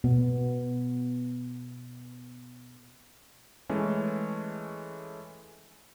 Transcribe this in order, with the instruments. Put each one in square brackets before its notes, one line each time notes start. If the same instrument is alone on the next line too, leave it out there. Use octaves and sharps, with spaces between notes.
[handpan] B2 B3
[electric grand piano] E3 G#3 A3 C#4